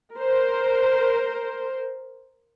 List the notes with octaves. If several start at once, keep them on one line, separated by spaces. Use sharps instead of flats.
A#4 C5